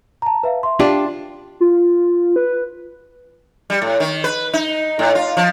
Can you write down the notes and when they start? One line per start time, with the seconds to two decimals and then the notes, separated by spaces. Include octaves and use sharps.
0.22 A5 A#5
0.43 B4 E5 F5
0.63 E5 C6
0.80 D4 F4 G4
1.60 F4
2.36 B4
3.70 G3
3.82 A2
4.00 D#3
4.24 B4
4.53 D#4
4.99 A2
5.15 F4
5.37 F3